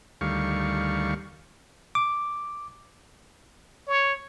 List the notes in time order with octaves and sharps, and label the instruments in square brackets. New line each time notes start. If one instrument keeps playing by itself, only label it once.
[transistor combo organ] D2 D#3 G3 F5 C#6
[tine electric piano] D6
[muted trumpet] C#5